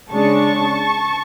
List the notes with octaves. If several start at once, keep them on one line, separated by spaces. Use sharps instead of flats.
C#3 G#3 D4 A5 C#6